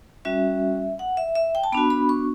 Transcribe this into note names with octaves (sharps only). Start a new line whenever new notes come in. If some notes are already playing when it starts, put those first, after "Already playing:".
G3 C#4 F#4 E5
F#5
E5
E5
G5
A5
B3 D4 F#4 B5
B5
C#6